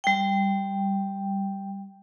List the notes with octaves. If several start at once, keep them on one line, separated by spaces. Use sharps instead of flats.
G3 G5